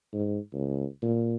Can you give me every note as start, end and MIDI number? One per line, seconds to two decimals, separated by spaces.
0.13 0.38 44
0.54 0.86 37
1.02 1.36 46